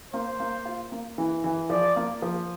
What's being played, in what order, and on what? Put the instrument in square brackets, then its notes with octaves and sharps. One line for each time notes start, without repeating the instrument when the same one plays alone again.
[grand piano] A#3 [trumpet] C5
[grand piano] A#3
F4
A#3
E3
E3
[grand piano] F3 [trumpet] D5
[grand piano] A#3
F3